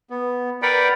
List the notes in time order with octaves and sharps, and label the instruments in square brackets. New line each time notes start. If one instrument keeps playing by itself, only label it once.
[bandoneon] B3
A#4 B4 D5 F#5 G5 B5